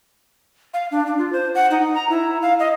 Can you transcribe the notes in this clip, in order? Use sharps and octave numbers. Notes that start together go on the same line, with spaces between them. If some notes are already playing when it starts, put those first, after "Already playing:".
F5
D4
D4
F4
C5
F#5
D#4
A#5
E4
F5
D#5